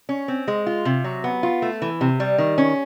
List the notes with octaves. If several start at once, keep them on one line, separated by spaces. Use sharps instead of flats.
C#4
C4
G#3
F4
C3
F#3
B3
F4
A3
E3
C3
G3
D#3
C#4